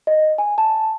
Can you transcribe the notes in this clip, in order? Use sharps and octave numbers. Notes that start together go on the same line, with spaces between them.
D#5
G#5
A5